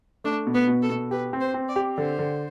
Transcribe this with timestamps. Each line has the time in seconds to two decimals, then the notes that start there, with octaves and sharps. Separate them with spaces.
0.24 A3 D4
0.47 B2
0.54 B3
0.68 B2
0.82 A4
0.90 B2
1.11 G4 B4
1.33 C4
1.40 C5
1.54 C4
1.68 D5
1.76 G4
1.97 D3 C5
2.19 D3